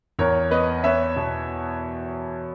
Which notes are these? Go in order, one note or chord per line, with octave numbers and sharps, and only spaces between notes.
E2 A#4 C#5
B3 B4 D#5
B3 C#5 E5
B2